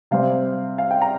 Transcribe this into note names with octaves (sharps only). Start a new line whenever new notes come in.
C3 G3 C4 F5
F5
G5
A#5